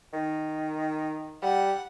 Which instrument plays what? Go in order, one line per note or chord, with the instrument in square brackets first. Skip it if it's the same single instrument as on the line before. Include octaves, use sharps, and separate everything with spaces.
[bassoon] D#3
[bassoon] G3 [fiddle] F#5